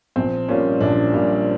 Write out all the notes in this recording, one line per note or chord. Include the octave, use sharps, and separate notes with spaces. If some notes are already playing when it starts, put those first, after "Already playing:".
A#1 C4
A#2 G3 C#4
A#1 D4
A#2 G3